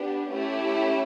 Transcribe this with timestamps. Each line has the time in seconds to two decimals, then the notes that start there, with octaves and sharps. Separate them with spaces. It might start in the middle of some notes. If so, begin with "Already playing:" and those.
Already playing: B3 D4 G4
0.31 A3 C#4 E4 G4